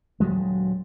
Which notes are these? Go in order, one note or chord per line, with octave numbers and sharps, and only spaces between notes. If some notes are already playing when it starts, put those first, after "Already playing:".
D#1 G2 F#3 G#3